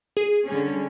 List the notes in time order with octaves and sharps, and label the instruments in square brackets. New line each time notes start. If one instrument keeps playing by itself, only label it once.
[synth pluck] G#4
[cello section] D3 G3 C#4